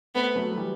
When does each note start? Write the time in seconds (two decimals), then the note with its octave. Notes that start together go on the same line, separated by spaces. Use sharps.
0.15 A3 B3 C4
0.36 F#3 A3
0.52 F#3
0.57 E3 G3